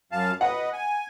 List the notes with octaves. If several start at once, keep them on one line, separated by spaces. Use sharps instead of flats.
F#2 F5 A5
B4 D#5 F#5
G#5